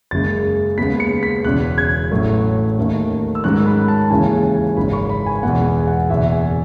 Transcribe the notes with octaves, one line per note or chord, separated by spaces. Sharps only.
F#1 F#2 C#3 G#3 A6
D#2 C#3 G#3 B3 B6
C#7
B6
E1 E2 C#3 F#6
G#6
A1 A2 F#3 A3
D#2 D#3 A3 C#4
E6
G#2 D#3 F#3 C#4 F#6
B5
A5
D#2 C#3 E3 G#3 C#4 G#5
G#5
G#1 F#2 C#3 B5
C#6
B5
G#5
E2 B2 G#3 B3 F#5
G#5
F#5
F#1 E2 B2 E5
G#5